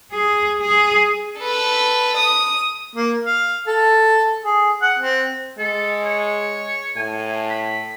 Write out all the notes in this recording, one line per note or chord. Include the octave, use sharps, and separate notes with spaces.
G#4
G#4
A4 B4
D#6
A#3
F5
A4
G#4
F#5
C4
G#3 A4
C#5
A2 G#5
B5